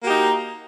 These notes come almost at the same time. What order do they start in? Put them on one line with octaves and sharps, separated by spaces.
A#3 F#4 G4 D#4